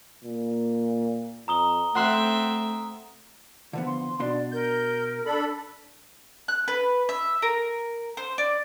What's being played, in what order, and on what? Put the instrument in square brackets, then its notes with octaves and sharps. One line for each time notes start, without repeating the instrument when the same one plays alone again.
[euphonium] A#2
[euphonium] F2 [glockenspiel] A#5 D#6 G7
[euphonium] A3 [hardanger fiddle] C4 E5 [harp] F#5 C6 F#6
[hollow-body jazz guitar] D3 F3 B3 [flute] F#5
[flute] C6
[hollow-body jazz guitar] B2 D4 C6 [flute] D5
[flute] A#4 [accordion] G6
[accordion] D4 A4 B5
[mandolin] F#6
B4
E5
A#4
C5
D5